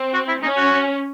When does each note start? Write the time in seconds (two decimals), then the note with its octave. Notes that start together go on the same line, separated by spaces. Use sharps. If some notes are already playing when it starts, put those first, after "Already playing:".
Already playing: C4
0.14 F#4
0.28 E4
0.42 C#4 D#4
0.57 F#4